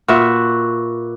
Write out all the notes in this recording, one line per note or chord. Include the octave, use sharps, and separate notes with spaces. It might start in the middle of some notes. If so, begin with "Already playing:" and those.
A#2 F#4 B4 E5